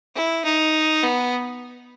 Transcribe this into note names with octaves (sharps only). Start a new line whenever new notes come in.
E4
D#4
B3